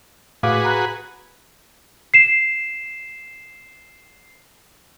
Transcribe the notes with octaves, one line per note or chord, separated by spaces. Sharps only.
A2 F#4 G#4 B4 F5 D6
A#5 B5 F#6
C7 E7